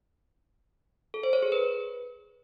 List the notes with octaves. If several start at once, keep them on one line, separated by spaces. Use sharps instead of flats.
A4
C5
C#5
G#4
B4